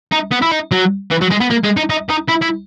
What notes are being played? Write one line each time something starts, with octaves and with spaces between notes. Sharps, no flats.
D#4
B3
E4
D#4
F#3
E3
F#3
G#3
B3
A#3
G#3
D#4
D#4
D#4
E4
E4